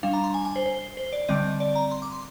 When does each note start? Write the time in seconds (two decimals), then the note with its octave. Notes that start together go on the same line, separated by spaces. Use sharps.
0.03 G3 D4 F5
0.13 A#5
0.24 C6
0.34 G#5
0.45 G#5
0.56 C5
0.66 C5
0.97 C5
1.13 D5
1.29 D3 G3 C4 D#5
1.60 D5
1.76 A#5
1.91 C6
2.02 D6
2.12 C6